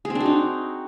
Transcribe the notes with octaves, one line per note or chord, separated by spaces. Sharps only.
G#4
C4
D4
F#4
D#4